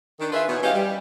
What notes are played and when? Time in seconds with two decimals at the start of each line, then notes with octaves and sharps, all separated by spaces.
0.20 D#3 D4
0.32 F4 G#4 B4 E5
0.48 B2 E3 B3 D#4 C#5
0.62 E3 G#3 C#4 G4 D#5 F5
0.74 G3